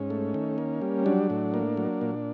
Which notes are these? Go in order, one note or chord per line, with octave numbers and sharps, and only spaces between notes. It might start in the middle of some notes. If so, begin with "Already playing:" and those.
Already playing: G#2 C#4
A3
D#3
A#3
G3
F#3 D4
A2
A#3
F#3
A#2